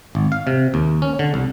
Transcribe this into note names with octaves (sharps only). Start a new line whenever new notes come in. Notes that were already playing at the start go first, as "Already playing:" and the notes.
G#1
F5
C3
D#2
C#4
D3
C2